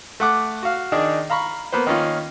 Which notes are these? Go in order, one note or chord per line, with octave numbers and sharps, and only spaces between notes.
A3 F#5 D6
F#4 F5
D#3 D4 D#4 G#4
F5 A#5 B5 C#6
A#3 B3 B4 C5
D#3 A#3 C#4 F4